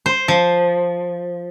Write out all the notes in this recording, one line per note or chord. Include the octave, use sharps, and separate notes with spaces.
C5
F3